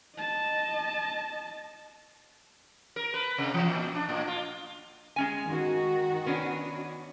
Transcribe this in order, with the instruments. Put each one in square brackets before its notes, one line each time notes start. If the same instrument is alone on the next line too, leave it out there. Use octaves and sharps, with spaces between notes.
[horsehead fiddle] D#5 A5
[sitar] A#4
B4
C3
E3
A#2
D4
A2
F4
[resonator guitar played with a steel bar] G#3 C#4 G#5
[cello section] D#3 F#4
[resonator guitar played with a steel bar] B3 C#4 D4